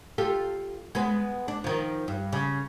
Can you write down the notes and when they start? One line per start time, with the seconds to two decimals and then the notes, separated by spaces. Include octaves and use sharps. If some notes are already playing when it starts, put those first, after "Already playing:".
0.18 F4 G4 A4
0.95 G#3 B3 B4
1.48 D4
1.64 D#3 F3
2.08 G2
2.33 C#3